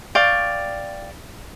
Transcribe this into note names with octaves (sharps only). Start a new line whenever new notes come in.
D5 F5 G5 C#6